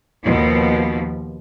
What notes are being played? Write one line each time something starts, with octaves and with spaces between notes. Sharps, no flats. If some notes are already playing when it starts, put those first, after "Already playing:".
D#2 B2 F3